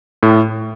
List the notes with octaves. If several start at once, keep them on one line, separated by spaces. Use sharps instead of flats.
A2